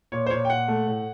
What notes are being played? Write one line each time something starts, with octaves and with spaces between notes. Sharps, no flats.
A#2 C#5
C5
A#2 C#5
G5
A#2 F#5
A3
A2